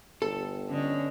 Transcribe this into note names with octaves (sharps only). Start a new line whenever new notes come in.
G1 A4
D3 C#4 D#5